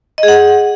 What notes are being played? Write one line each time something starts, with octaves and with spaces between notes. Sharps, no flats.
D#5
G#4
F#5